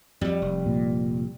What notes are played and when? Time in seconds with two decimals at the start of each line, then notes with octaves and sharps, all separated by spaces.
0.21 F2 F#3 G3
0.42 F1
0.66 A#2